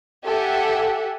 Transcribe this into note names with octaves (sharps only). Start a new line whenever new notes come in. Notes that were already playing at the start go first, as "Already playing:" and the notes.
G4 A4 E5 F#5 G#5